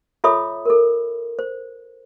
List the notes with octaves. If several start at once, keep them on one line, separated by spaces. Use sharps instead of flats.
F4 A4 C#5 E5 B5 D#6
A4 A#4
C5